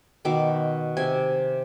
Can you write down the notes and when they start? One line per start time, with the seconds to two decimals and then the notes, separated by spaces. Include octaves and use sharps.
0.25 B2 D#3 E5 D6
0.97 C3 G#5